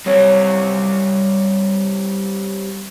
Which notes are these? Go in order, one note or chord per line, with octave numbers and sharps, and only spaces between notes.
F#3 G3 A#3 C4 C#4